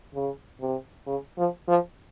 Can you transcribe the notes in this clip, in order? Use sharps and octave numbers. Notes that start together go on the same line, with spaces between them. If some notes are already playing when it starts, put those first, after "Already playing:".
C#3
C3
C#3
F3
F3